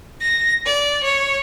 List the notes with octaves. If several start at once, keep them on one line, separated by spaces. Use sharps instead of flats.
A#6
D5
C#5